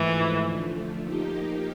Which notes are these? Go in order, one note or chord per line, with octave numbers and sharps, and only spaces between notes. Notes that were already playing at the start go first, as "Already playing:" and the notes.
Already playing: G#2 E3 F3 A3
D3 F3 A3
F3 A#3 D#4 G4